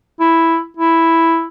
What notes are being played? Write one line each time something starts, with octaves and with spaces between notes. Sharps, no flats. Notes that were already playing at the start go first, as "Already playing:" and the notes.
E4
E4